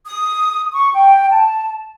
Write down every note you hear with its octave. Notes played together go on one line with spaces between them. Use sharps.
D#6
C#6
G5
A5